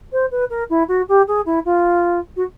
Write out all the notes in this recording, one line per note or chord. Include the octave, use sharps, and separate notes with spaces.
C5
B4
A#4
E4
F#4
G4
G#4
E4
F4
F#4